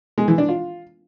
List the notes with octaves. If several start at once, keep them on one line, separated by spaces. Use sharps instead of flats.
G#3
E3
D4
F4